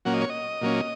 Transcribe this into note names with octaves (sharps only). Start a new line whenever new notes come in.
A#2 F#3 A#3 C#4 F#5
D#5
C#5
D#5
A#2 F#3 A#3 C#4